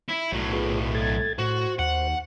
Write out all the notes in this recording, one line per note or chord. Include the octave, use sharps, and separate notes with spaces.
E4
B1 A2 F#3
F4 G#4 B4
A4 G#6 A6
A2 F#4 C5
D#2 F#5